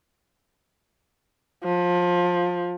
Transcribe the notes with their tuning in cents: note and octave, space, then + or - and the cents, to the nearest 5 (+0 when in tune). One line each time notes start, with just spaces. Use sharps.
F3 +20